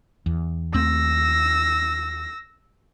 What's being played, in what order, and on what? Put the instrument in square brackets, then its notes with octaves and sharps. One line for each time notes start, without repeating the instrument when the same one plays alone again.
[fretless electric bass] E2
[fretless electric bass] D#2 A3 C4 [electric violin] E6 A#6